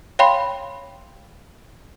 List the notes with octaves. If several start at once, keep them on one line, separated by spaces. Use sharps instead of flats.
C#5 F5 G5 B5 C6